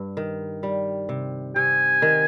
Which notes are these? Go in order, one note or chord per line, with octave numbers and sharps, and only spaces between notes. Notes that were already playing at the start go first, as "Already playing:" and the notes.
Already playing: G2
D#3
G3
C3
C3 G#5
D#3